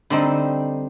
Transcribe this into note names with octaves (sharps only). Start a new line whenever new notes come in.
D3 G3 C4 D#4